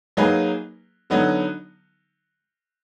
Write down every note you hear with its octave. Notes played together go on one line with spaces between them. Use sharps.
F#3 A#3 D#4 G#4 B4
D3 F#3 B3 D#4